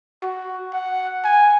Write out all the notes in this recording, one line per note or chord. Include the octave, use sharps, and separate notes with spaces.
F#4
F#5
G#5